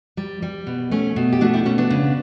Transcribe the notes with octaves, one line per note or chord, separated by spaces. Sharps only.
G3
G3
B2
A3 C#4
B2
G4
A3 D4 F#4
E4 G4
B2 C#4
B3 D4
C#3